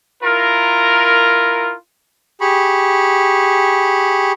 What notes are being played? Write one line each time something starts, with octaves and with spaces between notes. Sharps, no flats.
E4 F4 A#4
G4 G#4 B5 C#6